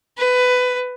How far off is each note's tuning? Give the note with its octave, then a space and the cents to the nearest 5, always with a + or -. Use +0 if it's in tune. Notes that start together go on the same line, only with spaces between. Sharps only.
B4 +15